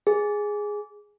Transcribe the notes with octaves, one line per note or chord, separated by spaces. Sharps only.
G#4